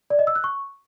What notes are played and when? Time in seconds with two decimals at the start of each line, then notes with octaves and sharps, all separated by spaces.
0.10 D5
0.19 D#5
0.27 E6
0.36 F#6
0.44 C#6